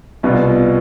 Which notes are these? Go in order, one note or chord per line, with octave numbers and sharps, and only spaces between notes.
C2 B2 B3 F4